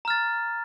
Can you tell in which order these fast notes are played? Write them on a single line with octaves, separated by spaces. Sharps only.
A#5 F6 A6